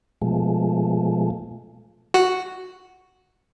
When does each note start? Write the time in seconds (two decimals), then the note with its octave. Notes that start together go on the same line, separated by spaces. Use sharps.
0.22 B2 F3 G#3 A3
2.14 F#4